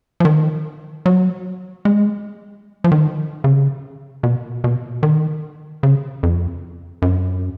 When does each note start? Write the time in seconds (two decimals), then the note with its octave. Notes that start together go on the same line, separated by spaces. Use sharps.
0.20 F3
0.25 D#3
1.06 F#3
1.85 G#3
2.84 F3
2.92 D#3
3.44 C#3
4.23 B2
4.64 B2
5.03 D#3
5.83 C#3
6.23 F2
7.02 F#2